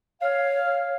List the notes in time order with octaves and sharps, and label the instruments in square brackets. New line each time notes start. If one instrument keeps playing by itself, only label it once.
[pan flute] C#5 [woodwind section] F5